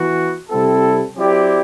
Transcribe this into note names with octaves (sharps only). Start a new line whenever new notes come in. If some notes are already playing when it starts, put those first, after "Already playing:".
Already playing: E3 B3 F#4
C3 G3 C4 E4 A4
F#3 C4 E4 G4 D5